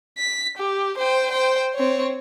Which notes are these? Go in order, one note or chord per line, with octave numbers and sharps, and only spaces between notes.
B6
G4
C5 G5
C5 G5
C4 C#5